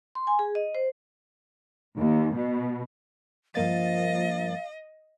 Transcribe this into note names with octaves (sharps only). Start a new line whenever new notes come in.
C6
G#5
G#4
D#5
C5
D#2
B2
G2 F3 A#3 D#5 F5 A6